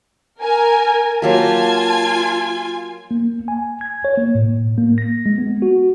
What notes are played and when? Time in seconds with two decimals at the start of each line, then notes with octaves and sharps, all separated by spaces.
0.41 A#4 G#5
1.22 F#3 A#3 F4 G4 G#5 A5
3.11 A#3
3.48 G#5
3.81 G#6
4.05 C#5
4.18 A#3
4.35 A2
4.78 A#3
4.98 A#6
5.26 G#3
5.38 B3
5.62 F#4